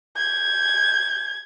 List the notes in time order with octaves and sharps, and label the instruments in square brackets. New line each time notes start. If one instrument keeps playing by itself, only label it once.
[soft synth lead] G6 [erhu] G#6